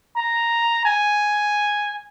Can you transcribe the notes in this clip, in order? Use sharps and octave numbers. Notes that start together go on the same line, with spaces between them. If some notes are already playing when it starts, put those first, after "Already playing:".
A#5
G#5